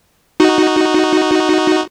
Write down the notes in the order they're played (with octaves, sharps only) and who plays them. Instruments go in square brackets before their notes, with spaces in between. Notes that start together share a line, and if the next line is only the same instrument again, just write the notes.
[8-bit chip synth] D#4 F#4